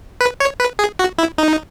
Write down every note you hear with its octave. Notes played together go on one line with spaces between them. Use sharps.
B4
C#5
B4
G#4
F#4
E4
D#4